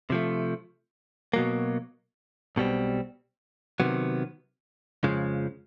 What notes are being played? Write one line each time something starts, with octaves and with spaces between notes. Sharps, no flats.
C3 F3 A3
B2 F#3 A#3
B1 B2 G3 C4
C3 D#3 F#3 B3
F2 C#3 F3 G#3